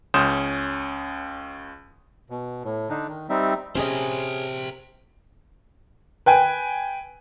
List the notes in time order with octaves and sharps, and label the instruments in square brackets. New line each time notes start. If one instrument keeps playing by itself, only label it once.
[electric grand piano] C#2 C#4 C6 D#6 G6 E7
[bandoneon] B2
A2
D3 D4 D#4
D#3
G3 C4 D#4 E5
[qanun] C3 C4 F#5 [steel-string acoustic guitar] C#4 G#4 D#5 [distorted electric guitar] A#4 C5
[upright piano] B4 G5 G#5